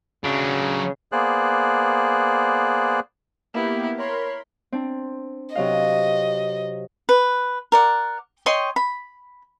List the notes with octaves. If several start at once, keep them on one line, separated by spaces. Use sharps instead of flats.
C#3 F#3 D4
A#3 B3 G#4 C5 D5 F#6
A#3 B3 E4 G4
A#4 C#5 B5 C6
C4 D4
C3 F#3 D#5 F5
B4
A#4 D5 F#5
C#5 D#5 G5 C6
B5